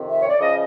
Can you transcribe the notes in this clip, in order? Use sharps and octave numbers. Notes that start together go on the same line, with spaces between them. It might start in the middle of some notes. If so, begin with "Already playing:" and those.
Already playing: F2 C3 D#3
E5
C#5
D5
C#3 F3 D#5